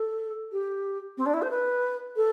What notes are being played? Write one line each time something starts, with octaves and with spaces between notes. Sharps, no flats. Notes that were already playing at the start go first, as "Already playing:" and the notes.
Already playing: A4
G4
C4
D4
E4
C5
B4
A4